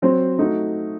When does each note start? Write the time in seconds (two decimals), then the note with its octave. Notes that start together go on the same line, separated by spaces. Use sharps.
0.02 F#3 C4 F#4 C5
0.39 A3 D#4 F#4